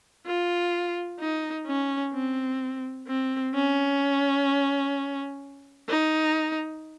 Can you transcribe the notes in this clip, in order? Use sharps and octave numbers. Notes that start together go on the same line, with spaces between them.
F4
D#4
C#4
C4
C4
C#4
D#4